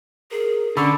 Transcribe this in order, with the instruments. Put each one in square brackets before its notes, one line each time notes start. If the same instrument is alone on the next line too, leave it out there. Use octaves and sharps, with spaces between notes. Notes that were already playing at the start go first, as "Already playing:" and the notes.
[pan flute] G#4 [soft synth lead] A#4
[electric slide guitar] D3 [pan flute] C#4 [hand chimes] B5 D6 E6 [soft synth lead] C#6